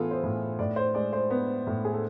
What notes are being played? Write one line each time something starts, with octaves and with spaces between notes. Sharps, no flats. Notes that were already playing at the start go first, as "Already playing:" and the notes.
Already playing: A2 E3 B3 F4 G#4 A4
C5
A2
A2 D5
C5
G#3 D5
C5
B3
A2
G#4
A4